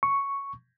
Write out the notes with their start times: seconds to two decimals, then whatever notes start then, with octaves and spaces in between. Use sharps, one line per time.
0.03 C#6